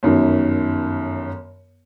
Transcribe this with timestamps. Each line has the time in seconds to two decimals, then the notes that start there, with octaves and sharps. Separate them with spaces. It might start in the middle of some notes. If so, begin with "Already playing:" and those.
0.03 G1 F#2 D#3